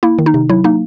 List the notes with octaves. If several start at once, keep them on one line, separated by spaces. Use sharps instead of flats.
A#3 E4
D#3
D#4
C3
F#3 E4
A#3 D#4